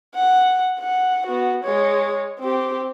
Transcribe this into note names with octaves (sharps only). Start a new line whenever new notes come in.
F#5
F#5
B3 F#4
G#3 C#5
C4 G4